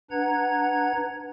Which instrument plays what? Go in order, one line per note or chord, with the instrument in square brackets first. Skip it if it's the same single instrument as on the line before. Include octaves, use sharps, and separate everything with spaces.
[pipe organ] D4 B4 F#5 A#5 G#6